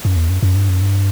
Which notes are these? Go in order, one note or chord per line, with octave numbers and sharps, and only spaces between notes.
F#2
E2
F#2
F#2
G2
F#2
G2